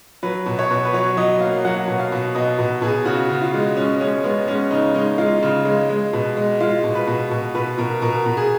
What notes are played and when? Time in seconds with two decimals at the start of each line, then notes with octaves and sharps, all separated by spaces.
0.23 F#3 B4
0.46 B2
0.59 C#5
0.71 B2
0.85 B4
0.93 F#3 C#5
1.17 F#3 D#5
1.40 A#3 F5
1.65 F#3 F#5
1.88 B2
1.99 F5
2.12 B2
2.35 B2 D#5
2.59 B2
2.82 B2 G#4
3.05 C#3 F#4
3.30 C#3
3.42 F4
3.54 G#3
3.77 G#3 C#4
4.01 G#3 C#4
4.24 G#3 B3
4.48 G#3 C#4
4.71 C#3 D#4
4.94 G#3 D#4
5.18 G#3 F4
5.43 C#3
5.65 G#3
5.89 G#3
6.13 B2
6.37 G#3
6.60 G#3 F4
6.84 B2
6.95 B4
7.07 B2
7.31 B2
7.55 B2 B4
7.78 B2 A#4
8.02 B2 A#4
8.26 B2
8.37 G#4